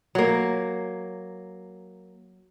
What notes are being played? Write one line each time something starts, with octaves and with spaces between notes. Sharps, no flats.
F#3 A#3